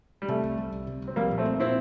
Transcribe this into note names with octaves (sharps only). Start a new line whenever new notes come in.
G3
C3 A3
C2
G3
C2
C3
C2
C4
F3 G3 A#3
A#2
A3 C4
A#3
A#2 C4 E4